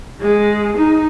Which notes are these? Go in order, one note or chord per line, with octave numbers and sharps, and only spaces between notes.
G#3
D#4